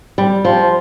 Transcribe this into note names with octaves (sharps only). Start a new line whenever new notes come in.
G3
F3